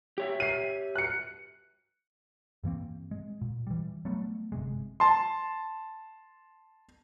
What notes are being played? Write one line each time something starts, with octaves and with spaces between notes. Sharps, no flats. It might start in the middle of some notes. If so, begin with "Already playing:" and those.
G4 C#5 E5
C7 D#7
F#6 C#7
G2 E3 A#3 C4
G#3
A#2
E3 G3
F#3 G3 A3 B3
G1 C3 G#3
A5 C6